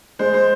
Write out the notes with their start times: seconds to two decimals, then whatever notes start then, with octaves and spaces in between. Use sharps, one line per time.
0.19 G#3 C5
0.34 C5